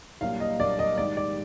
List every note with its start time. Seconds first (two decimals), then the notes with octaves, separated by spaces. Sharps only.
0.21 C2 A#2 F#3 A#3 D4 F5
0.40 D#5
0.60 C2 A#2 F#3 A#3 D4 D5
0.79 D#5
0.98 G#2 D#3 G3 D5
1.17 D5